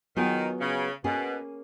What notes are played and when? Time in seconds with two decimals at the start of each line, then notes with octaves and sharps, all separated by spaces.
0.16 D#3 F#3 B3 F4 G#4
0.61 C#3
1.04 B2 A#3 C#4 G#4